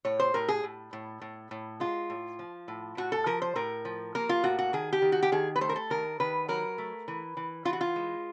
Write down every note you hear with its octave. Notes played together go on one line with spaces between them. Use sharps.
A2 C#5
C5
A2 A#4
G#4
A2
A2
A2
A2
G#3 F4
A2
F3
A2
A2 F#4
A4
F3 A#4
C5
A2 A#4
F3
A#3 A#4
F4
A2 F#4
F#4
D#3 G#4
G4
D#3
F#4
G4
D#3 G#4
B4
A3 C5
A#4
A4
D#3 A#4
D#3 B4
F#3 A#4
A3
E3
E3
E3 F4
F#4
F4
G#3